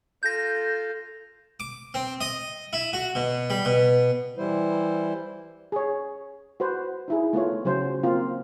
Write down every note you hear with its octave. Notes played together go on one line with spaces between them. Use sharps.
F4 A4 G6 A#6
D6
C4
D#5
E4
F#4
B2
G3
B2
E3 G3 E4 C5
G#4 C#5
F#4 B4 C5
D#4 E4 G#4
A3 B3 F4 C#5
C#3 F#3 C#4 C5
A#3 C4 F4